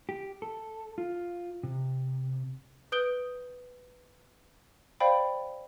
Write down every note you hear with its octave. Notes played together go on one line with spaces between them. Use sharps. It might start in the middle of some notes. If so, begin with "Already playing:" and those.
G4
A4
F4
C3
B4 D#6 G6 D7 G7
C5 D5 F5 G5 B5